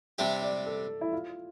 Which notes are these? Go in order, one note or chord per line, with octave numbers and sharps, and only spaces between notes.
C3 G3 D4 G4 E5
D5
A4
E4
F4